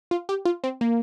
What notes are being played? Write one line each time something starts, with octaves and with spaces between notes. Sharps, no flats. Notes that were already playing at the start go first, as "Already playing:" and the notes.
F4
G4
F4
C4
A#3